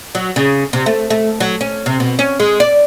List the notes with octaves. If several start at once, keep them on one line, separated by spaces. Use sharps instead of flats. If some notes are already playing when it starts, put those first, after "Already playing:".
F#3
C#3
C3
A3
A3
F#3
C#4
C3
B2
C#4
G#3
D5